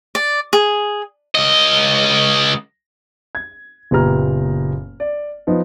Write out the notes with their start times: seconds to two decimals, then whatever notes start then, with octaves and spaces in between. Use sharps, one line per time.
0.15 D5
0.53 G#4
1.35 C#2 D#5
3.35 G#6
3.91 F#1 A#2 B3 G4 A#5 F6
5.00 D5
5.47 F3 B3 D#4